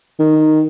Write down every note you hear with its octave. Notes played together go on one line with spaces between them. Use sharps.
D#3